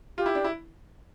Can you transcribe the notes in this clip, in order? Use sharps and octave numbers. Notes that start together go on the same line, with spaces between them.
F4 G4
E4
D4
E4